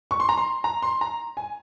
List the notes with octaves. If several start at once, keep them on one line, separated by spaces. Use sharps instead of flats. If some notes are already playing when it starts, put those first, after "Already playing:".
C#6
C6
A#5
C6
A#5
C6
A#5
G#5